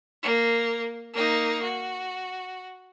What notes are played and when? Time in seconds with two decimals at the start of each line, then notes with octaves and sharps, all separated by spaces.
0.23 A#3
1.14 A#3 D#4
1.63 F#4